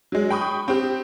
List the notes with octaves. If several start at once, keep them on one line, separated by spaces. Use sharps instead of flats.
F#3 G#3
G5 B5 C#6 D#6
C4 G4